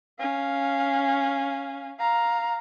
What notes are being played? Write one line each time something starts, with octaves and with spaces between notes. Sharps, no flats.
C#4 F5
F5 A#5